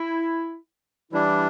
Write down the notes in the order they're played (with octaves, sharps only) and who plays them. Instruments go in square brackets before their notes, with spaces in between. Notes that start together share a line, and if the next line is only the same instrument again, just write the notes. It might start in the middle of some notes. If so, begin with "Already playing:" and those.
Already playing: [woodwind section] E4
[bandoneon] E3 G3 D4 [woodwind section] E4